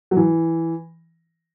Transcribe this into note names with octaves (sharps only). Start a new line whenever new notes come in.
F#3
E3